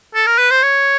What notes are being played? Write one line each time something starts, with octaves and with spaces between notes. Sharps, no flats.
A4
A#4
B4
C5
C#5